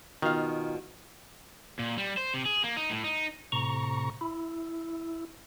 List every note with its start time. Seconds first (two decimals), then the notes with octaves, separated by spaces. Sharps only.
0.22 B2 D#3 F4 F5
1.79 A#2
1.98 G3
2.17 C5
2.34 C3
2.45 G#4
2.64 A#3
2.77 D#4
2.90 A2
3.04 D#4
3.52 A2 C3 A#5 C#6
4.21 E4